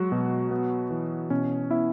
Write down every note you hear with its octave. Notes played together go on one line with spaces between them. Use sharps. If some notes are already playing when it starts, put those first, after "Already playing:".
Already playing: F#3 G#3 F#4
B2
B3
E3
B2 C#4
B3 E4 E5